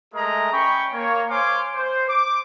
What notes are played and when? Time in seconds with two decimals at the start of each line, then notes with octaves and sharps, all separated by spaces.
0.14 G#3 A3 G#4 A#4 D#5 A#5
0.52 C#4 G5 B5 C#6
0.94 A#3 C#5
1.30 C5 C#5 F5 G#5 C6 D6
1.75 C5
2.09 D6